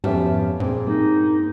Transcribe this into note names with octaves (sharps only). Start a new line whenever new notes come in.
F2 G#2 B3 C#4 G4 E5 A5
G2 A#2 C4 G#4
A#3 D#4